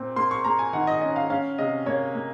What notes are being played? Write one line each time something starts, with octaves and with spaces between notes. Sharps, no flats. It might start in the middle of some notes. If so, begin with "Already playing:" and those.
Already playing: A#2 C4
A#3 C6
C#6
A#3 A#5
G#5
D#3 F#5
D#5
C#4 D#5
F5
C#4 F5
C3 D#5
A#3 C#5
A#3